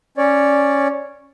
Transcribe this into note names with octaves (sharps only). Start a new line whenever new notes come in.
C#4 C#5 D5